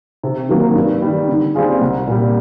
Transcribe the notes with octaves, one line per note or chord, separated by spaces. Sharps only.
C3
D#3 F#3 A#3
G2
D#3 G3
D3
G3 C4 F4 G#4
C2
A#2 G3